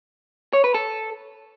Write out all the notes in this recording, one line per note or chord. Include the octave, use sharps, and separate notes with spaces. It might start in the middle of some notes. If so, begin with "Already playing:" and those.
C#5
B4
A4